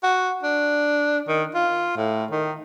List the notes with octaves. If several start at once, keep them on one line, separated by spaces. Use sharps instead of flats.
F#4
D4
D#3
F4
A2
D#3